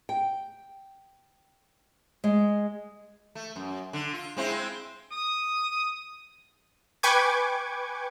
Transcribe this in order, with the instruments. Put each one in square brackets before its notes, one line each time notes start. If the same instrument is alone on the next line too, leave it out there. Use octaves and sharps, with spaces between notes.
[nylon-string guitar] G5
G#3
[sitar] A3
F#2
D3
F4
G#3 C4 E4
[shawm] D#6
[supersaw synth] B4 G5 G#5 C#6 D6 G#6